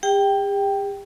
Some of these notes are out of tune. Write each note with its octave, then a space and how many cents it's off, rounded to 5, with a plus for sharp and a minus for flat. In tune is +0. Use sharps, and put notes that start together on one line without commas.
G4 +45 G5 +0